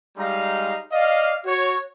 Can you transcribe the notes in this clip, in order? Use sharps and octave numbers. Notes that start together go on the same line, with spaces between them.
G3 G#3 D#4 F5 A#5
D5 D#5 F5
F#4 C#5